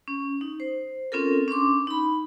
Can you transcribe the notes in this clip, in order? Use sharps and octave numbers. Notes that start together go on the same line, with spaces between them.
C#4
D#4
C5
C4 C#4 F4 A4 A#4
C#4 D4 C6 D6
D#4 B5